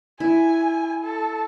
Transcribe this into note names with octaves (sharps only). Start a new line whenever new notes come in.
E4 G#5
A4